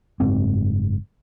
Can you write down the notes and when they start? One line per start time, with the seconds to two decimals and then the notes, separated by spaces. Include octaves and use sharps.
0.20 F#1 G#2 C4